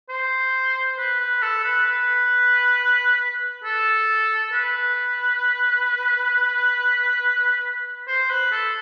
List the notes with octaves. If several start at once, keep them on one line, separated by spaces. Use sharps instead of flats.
C5
B4
B4
A4
B4
B4
A4
B4
C5
B4
A4